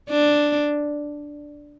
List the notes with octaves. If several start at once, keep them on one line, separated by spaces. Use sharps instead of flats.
D4